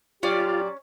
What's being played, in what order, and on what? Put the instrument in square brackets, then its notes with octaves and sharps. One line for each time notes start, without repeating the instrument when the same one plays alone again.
[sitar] A#2 F#3 D5 [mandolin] C#4 [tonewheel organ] F4 [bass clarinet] G4